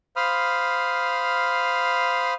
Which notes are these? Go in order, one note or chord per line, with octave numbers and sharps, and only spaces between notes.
C5 F5 B5 D#6 F6